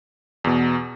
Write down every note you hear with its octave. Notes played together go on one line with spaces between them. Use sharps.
E2 B2